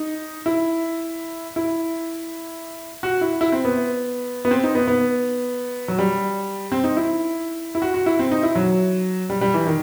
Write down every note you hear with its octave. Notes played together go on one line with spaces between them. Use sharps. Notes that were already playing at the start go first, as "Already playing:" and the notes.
Already playing: D#4
E4
E4
F#4
E4
E4
C4
B3
B3
C4
D#4
B3
B3
F#3
G3
C4
D#4
E4
E4
F#4
F#4
E4
C4
D#4
E4
F#3
G3
G3
E3
D#3